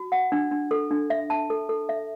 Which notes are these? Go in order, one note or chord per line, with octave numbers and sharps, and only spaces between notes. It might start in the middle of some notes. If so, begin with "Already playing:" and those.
Already playing: F#4
F#5
D4
D4
A4
D4
E5
A5
A4
A4
E5